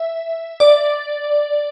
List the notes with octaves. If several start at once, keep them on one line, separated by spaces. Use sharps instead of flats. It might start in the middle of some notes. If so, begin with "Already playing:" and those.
Already playing: E5
D5